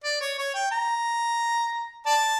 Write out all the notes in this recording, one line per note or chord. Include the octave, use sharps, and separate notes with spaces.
D5
C#5
C#5
G5
A#5
D5 A5